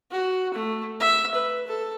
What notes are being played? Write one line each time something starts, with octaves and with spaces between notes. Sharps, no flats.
F#4
A3
E5
B4
A4